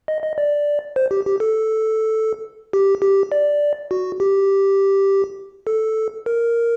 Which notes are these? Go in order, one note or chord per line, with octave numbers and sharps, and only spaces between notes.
D#5
D#5
D5
C5
G4
G4
A4
G4
G4
D5
F#4
G4
A4
A#4